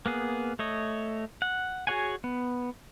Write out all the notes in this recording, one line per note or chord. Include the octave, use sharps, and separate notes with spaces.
A#3 B3 G#4
A3 C#5 D#5
F#5
F#4 G#4 C#5 F#5 G#5
B3